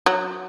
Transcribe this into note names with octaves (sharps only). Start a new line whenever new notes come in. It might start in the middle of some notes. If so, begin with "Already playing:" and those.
F#3